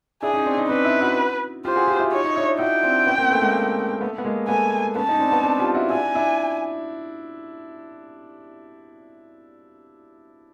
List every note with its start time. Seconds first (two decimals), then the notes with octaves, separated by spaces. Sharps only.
0.22 D4 E4 G#4
0.34 C#4 D#4
0.46 C4 D4
0.57 C#4 D#4
0.69 C4 D4 B4
0.85 D4 E4
1.01 E4 F#4
1.65 F4 G4 C5
1.76 F#4 G#4
1.88 F4 G4
2.00 E4 F#4
2.11 D#4 F4 C#5
2.24 D#4
2.36 D4 E4
2.59 E4 F#4 G5
2.83 C4 D4
3.06 B3 C#4
3.18 A#3 C4
3.30 A3 B3
3.42 G#3 A#3
3.94 A#3
4.01 A3 B3
4.18 B3
4.25 G#3 A#3
4.48 A3 B3 G#5
4.95 B3 C#4 A5
5.08 C#4 D#4
5.19 C4 D4
5.32 B3 C#4
5.43 C4 D4
5.59 F4 G4
5.74 E4 F#4
5.90 D4 E4 G#5
6.15 D4 E4